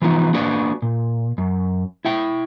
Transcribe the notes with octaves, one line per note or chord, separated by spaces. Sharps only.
E3 F3 B3 D#4
A#3 D4 F#4 B4 D5
A#2
F#2
E4 E5 G5